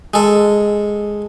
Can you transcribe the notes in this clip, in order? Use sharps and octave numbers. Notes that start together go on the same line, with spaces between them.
G#3 A4